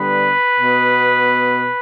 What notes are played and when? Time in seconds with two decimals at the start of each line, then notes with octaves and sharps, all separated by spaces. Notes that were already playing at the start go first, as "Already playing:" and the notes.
Already playing: D3 G3 B3 B4
0.59 B2 B3